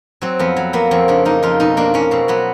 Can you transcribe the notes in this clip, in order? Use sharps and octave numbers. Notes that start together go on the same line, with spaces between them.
F#3 C4
F2 B3
F#3
A#3 B3
F2 C4
C#3 D4
A#3 D#4
F2 F4
B2 D#4
A#3 D4
A#3 C#4
B2 C4
F#3 B3